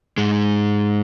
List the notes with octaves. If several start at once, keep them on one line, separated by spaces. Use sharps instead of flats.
G#2 G#3